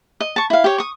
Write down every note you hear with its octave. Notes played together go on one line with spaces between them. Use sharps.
D#5
A5 C#6
E4 F5
G4 C#5
C#6 D#6